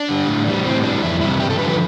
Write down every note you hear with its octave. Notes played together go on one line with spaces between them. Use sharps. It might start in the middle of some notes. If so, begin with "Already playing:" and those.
Already playing: D4
D3 G3
A2
E3 G3
A2 C4
E3 G3 D4
F2 E4
C3 E3 G3 E4
G2 G4
A4
D3 F3 B4
B4